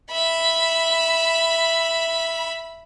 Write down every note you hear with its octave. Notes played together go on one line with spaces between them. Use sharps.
E5 B5